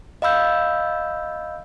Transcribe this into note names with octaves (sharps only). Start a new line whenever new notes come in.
D#5 F5 B5 E6 G6